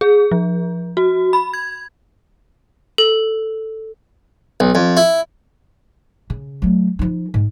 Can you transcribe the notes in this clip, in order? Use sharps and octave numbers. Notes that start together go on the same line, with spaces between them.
G#4
F3
F#4
B5
G#6
A4
B1
F2
E4
C#3
F#3 A3
F3 D#4
G#2